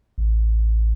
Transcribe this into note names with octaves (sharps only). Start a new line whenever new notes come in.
A1